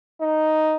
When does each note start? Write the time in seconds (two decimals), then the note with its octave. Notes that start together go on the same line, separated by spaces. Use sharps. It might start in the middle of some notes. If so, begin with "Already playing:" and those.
0.21 D#4